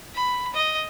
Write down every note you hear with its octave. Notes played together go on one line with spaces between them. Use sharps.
B5
D#5